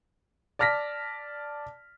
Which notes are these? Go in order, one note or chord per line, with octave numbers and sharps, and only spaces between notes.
D5 A5 F6 A#6 B6